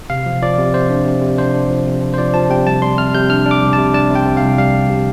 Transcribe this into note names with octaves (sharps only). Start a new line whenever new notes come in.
C3 F5
F3
F3 D5
C3
C3 C5
D4
C3
C3
D4 C5
D4
F3
C3
D4
C5
F3 D5
F3 A5
C3 G5
G3 A5
G3 C6
C3 F6
C3 G6
D4 F6
D4
D6
C2
C3 A5
D4 A5
C3
G5
C3
F5
C2
G3 F5
C3
C3